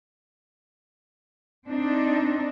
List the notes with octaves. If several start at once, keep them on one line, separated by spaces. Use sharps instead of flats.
C4 D4 D#4